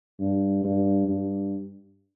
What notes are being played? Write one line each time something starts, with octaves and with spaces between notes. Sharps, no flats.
G2
G2
G2